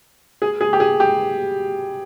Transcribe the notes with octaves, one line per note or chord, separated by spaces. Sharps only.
G#4
G#4
G4
G#4
G4